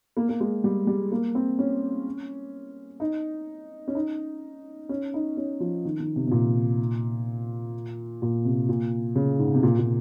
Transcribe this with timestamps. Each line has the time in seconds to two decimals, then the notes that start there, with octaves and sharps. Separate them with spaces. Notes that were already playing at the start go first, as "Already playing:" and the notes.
0.17 A#3
0.29 A#3
0.40 G#3
0.64 G3
0.87 G3
1.12 A#3
1.35 C4
1.59 C#4
3.00 D#4
3.88 C#4
3.95 D#4
4.89 C#4
5.14 D#4
5.37 C#4
5.60 F3
5.85 D#3
6.00 D#3
6.16 C3
6.27 C3
6.31 A#2
8.22 A#2
8.45 C3
8.69 A#2
9.16 C#3
9.39 G#2
9.54 C3
9.63 A#2
9.78 A#2